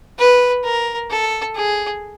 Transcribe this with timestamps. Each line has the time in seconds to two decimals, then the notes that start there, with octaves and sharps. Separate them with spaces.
0.19 B4
0.64 A#4
1.11 A4
1.56 G#4